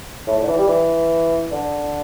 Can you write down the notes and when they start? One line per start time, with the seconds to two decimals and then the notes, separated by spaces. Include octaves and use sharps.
0.27 A2
0.38 A2
0.43 D3
0.47 E3
0.58 G3
0.68 E3
1.52 D3